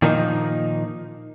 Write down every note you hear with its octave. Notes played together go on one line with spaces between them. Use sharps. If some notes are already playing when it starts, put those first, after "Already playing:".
A#2 D#3 F3 A#3 C#4 D#4